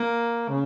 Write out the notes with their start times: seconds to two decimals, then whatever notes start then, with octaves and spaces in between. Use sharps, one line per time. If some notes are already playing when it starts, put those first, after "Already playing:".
Already playing: A#3
0.48 C#3